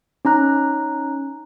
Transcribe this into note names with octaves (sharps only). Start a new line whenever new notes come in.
C#4 D#4 A#5 F#6